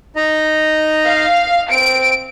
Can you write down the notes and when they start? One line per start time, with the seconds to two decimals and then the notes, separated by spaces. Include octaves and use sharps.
0.16 D#4 D#5 A#5
1.06 F5
1.71 C4 D7